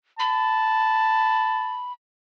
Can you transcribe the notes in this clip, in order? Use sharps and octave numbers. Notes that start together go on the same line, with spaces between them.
A5 B5